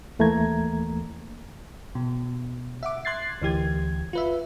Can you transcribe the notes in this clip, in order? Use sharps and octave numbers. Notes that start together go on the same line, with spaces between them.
D#2 E3 A3 A#3 A#5 G#6
B2
E5 F#5 D6
C6 F#6 G#6 A6 C7
D2 E3 G4 G#6
F4 B4 E5